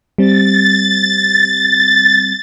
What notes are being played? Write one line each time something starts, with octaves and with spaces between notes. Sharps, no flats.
G3 C4 A6